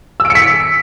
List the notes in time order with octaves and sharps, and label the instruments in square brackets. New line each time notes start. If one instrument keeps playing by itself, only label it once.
[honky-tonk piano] E6
D7
C#7
B6